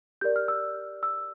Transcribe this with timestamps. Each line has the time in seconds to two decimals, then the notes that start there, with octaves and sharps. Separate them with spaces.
0.21 G4 A#4 D5 G6
0.36 F6
0.48 E6
1.03 E6